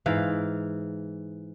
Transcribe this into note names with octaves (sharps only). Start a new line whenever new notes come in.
G#2 E3 F5